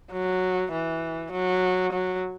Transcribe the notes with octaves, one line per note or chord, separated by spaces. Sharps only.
F#3
E3
F#3
F#3